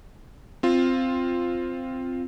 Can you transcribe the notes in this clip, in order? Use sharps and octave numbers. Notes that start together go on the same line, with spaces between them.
C4 F4